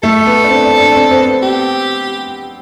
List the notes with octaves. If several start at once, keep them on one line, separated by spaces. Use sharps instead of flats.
A3 A4
B3
D4
C4
D4
D4
C4
C4
B3
G4